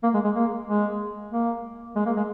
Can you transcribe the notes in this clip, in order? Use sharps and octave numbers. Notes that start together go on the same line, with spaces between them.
A#3
G#3
G#3
A#3
G#3
A#3
G#3
A#3
G#3